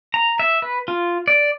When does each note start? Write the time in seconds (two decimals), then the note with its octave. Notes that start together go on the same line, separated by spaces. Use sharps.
0.14 A#5
0.39 E5
0.62 B4
0.88 F4
1.28 D5